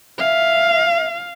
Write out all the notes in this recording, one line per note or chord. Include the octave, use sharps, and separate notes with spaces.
E5 F5